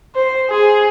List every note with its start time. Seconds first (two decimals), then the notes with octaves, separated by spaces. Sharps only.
0.15 C5
0.50 G#4